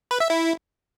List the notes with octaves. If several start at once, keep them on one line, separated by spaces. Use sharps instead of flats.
B4
E5
E4